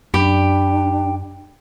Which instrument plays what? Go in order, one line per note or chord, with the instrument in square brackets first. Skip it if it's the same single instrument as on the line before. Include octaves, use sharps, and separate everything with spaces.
[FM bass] F#2 [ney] D4 [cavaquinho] G4 B5